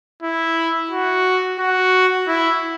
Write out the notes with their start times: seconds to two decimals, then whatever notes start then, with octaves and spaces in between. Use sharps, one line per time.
0.23 E4
0.91 F#4
1.59 F#4
2.28 E4